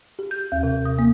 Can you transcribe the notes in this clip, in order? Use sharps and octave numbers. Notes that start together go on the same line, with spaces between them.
G4
G6
D#2
C3
D#6
A#3